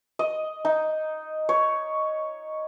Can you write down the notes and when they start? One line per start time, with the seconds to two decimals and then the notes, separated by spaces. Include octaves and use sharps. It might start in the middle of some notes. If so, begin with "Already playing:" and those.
0.19 D#5
0.65 D#4
1.49 C#5